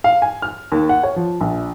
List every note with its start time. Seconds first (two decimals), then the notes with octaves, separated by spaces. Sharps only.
0.04 F5
0.22 G#5
0.42 F6
0.72 D#2
0.89 F#5
1.03 C#5
1.16 F3
1.41 A#1